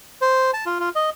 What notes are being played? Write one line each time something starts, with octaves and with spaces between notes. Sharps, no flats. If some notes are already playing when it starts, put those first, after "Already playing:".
C5
A5
F4
F4
D#5